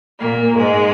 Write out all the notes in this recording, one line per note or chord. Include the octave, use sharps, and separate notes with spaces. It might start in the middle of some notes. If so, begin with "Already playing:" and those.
A#2 A#3
G#2 G#3